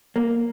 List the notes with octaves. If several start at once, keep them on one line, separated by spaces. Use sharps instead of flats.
A#3